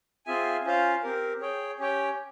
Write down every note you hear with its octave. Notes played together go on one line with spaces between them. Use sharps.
C4 F4 G#4 E5 G#5
C#4 F4 C5 F5
C4 G4 A#4
G#4 C#5 G5
C#4 G4 C#5 G5